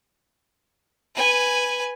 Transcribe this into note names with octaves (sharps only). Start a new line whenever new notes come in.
B4 G#5